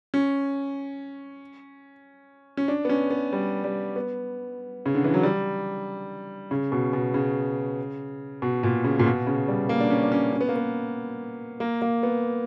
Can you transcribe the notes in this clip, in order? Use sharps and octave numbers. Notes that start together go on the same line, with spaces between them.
C#4
C#4
D4
B3
C#4
B3
G3
G3
B3
C#3
D3
E3
F#3
G3
C#3
B2
B2
C#3
B2
A#2
C#3
A#2
B2
C#3
G3
A#3
D4
C#4
D4
C#4
C#4
B3
A#3
B3
A#3
A#3
B3